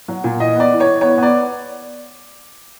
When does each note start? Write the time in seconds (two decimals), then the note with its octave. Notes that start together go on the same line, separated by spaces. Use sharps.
0.08 F#3
0.24 A#2
0.40 E3 D#5
0.56 B3 D5
0.71 E3
0.80 C#5
0.86 E3
1.01 B3 C#5
1.18 B3
1.23 D5